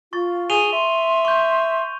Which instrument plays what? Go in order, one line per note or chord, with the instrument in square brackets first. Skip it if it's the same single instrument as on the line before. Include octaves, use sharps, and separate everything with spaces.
[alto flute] F4 [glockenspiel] C#6 A6
[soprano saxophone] G#4 [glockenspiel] D#7 F7 G7
[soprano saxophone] E5 [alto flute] C6
[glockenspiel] C#6 G6